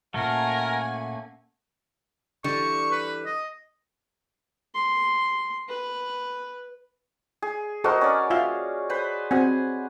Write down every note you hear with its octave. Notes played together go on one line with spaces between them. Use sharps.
A#2 A3 A#3 C#4 A#4 F#5 G#5 A5
D3 E3 G3 C#6
B4
D#5
C6
B4
G#4
F#4 A4 A#4 C5 D#5
C#4 D5
F4 E5 F5
B4 C5 B5
C4 F#4 F#5 G#5